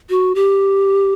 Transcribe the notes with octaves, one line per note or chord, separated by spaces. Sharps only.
F#4
G4